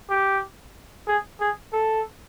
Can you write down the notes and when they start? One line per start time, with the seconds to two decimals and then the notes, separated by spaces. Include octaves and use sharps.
0.10 G4
1.07 G#4
1.40 G#4
1.73 A4